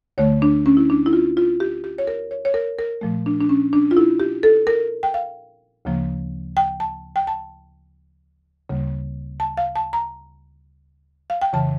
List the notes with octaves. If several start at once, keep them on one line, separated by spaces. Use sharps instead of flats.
D2 D3 A3 C#5
D4
C#4
E4
D4
E4
F4
F4
G4
G4
C#5
A#4
C#5
C#5
A#4
A#4
A#2 F3 A3
D4
D4
C#4
D4
F4
E4
G4
A4
A#4
G5
F5
D2 C#3 F3 A#3
G5
A5
G5
A5
D2 C#3 G3 A#3
A5
F5
A5
A#5
F5
G5
F2 C#3 E3 A5